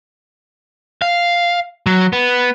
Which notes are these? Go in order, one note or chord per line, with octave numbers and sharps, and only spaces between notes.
F5
F#3
B3